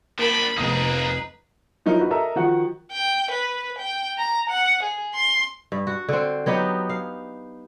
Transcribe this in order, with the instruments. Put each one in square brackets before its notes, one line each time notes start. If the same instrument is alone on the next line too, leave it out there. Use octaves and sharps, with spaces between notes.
[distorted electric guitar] F3 D4 [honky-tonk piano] A#3 A#4 [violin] B5
[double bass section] F1 [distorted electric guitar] A#3 G#4 [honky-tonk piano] B3 D#6 [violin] D#4 B4
[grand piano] F3 F#3 D#4 E4 A#4
D#4 F#4 B4
A4 A#4 D#5 E5 A#5
D#3 F3 F#4 F#5
[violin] G5
B4
G5
A#5
F#5
G#4
C6
[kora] G2
F#4
D3 C4
F#3 B3 D#4 G4
F5